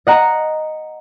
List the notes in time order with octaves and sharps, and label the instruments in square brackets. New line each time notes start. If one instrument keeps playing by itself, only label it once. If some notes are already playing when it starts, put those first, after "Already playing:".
[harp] D#5 F#5 A#5